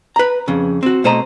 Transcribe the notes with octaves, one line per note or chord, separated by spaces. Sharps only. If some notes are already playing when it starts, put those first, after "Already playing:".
B4 A#5
F2 C#3
C4 F#4
B2 A3 C5 D#5 A#5